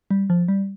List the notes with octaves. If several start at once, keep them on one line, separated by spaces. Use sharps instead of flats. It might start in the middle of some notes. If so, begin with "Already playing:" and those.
G3
F3
G3